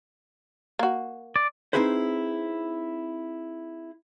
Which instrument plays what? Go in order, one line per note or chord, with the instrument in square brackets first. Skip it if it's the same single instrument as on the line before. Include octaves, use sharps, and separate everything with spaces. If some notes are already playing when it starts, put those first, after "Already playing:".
[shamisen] A#3 F#4
[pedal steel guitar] D5
[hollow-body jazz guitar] C4 D#4 E4 G#4 B4 C5